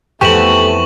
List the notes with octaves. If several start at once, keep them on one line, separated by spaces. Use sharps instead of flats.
F2 E3 A3 B3 G4 C#6 E7 F#7